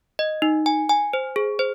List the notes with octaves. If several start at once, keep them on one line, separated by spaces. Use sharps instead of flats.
D#5
D#4
G#5
G#5
C5
G#4
C5